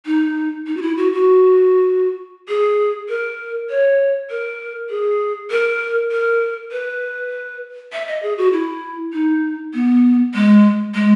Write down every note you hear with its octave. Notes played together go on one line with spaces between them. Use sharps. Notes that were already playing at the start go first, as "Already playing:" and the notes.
D#4
D#4
F#4
E4
F#4
F#4
G#4
A#4
C#5
A#4
G#4
A#4
A#4
B4
E5
D#5
G#4
F#4
E4
D#4
B3
G#3
G#3